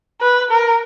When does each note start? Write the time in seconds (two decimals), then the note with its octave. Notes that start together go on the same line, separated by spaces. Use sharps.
0.21 B4
0.51 A#4